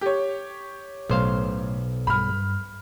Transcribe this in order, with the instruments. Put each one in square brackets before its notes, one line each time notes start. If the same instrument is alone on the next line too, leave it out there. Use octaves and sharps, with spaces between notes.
[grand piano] G4 C#5
[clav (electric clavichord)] B1 C5 F5 [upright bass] A2
[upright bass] G2 [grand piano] B5 F6